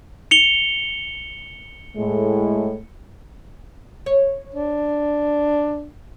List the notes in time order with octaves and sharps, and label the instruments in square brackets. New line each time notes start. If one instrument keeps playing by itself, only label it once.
[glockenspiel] C#7 F7 G7
[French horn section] A2 G#3
[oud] C#5
[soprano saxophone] D4